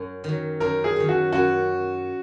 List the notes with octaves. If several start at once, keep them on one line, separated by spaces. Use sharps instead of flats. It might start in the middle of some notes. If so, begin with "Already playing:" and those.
Already playing: F#2 F#3
D#3 F#3
F#2 A#4
G#4
D#3 F#3
F#4
F#2 F#4